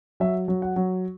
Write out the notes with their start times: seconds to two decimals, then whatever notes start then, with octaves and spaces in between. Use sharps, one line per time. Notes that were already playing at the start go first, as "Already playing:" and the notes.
0.20 F#3 E5
0.48 F#3
0.62 F#5
0.76 F#3